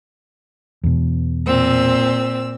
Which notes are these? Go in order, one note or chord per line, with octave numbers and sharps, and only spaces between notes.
E2 B2
A#2 C4 E6